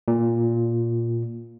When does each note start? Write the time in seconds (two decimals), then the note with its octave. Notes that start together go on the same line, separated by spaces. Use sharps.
0.08 A#2